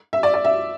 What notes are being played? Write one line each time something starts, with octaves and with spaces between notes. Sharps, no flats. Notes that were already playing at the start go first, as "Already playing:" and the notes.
E5
D5
D5
E5